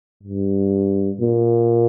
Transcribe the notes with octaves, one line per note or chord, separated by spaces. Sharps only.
G2
A#2